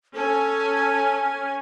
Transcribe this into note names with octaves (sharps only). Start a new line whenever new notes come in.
C#4 A4 G#5